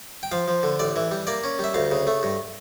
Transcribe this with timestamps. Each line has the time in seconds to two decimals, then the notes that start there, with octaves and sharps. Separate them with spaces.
0.23 G5
0.32 F3 F5
0.48 F3
0.63 D3
0.79 A1 D5
0.96 E3
1.11 G3
1.27 A#3 D5
1.44 C#4
1.59 G3 E5
1.74 D2 F5
1.91 C#3
2.07 A3
2.23 G2